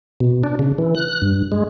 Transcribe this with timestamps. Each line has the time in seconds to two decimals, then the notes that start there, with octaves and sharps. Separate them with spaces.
0.20 B2
0.44 D4
0.59 C#3
0.78 E3
0.95 F#6
1.22 G2
1.52 G#3